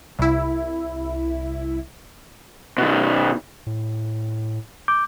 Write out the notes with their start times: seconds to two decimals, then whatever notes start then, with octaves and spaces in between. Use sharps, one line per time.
0.19 C2 E4
2.78 B2 D#3
3.67 A2
4.88 D6 G6